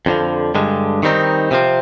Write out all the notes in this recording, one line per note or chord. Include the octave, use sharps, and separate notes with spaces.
F2 D3 F3
G2 D3 G#3
D#3 G3 C4 D#4
C3 F3 C4